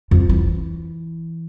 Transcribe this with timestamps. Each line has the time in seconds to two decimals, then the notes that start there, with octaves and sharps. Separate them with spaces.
0.11 F2
0.30 E3